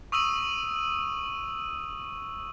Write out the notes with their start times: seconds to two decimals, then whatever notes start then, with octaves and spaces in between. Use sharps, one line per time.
0.12 C#6 D#6 E6 D#7 F#7